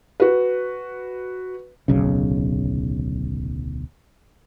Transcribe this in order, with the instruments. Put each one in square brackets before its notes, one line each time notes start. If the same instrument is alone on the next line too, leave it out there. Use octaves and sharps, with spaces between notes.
[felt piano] F#4 B4
[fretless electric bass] D1 B1 C#3